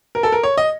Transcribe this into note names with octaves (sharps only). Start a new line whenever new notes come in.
A#4
A4
A#4
C#5
D#5